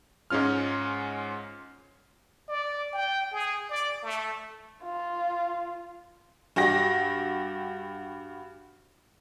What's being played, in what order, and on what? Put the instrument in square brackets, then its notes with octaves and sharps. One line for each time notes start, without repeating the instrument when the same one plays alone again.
[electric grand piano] G#2 G#3 C#4 F4 F6
[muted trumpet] D5
G5
G#4
D5
A3
[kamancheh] F4
[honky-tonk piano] G2 F#4 G4 A#6